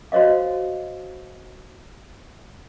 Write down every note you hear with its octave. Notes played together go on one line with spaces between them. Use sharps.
F#4 C5 C#5 D#5 F5